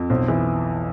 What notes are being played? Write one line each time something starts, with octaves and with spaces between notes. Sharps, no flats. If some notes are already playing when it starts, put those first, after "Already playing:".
Already playing: F2
B1 C5
E3